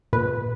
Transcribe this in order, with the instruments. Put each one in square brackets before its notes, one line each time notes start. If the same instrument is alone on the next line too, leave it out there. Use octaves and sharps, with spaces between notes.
[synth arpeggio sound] A#2 B4